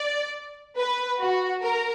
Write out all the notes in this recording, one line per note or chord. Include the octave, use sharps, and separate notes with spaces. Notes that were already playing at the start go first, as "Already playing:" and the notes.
Already playing: D5
B4
F#4
A#4